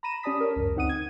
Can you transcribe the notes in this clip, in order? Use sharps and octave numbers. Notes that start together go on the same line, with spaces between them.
A#5 B5 A#6 D#7 E7
C#4 G4 D5 A5 D#6 B6
A#4 C#5
C#2 F#2
D2 C4 D#4 F#5 D#6 D#7
G#6